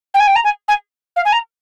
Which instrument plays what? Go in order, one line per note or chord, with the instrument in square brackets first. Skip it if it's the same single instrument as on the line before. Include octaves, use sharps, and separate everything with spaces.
[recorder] G5
G#5
G5
A#5
G#5
G#5
F5
G#5
A#5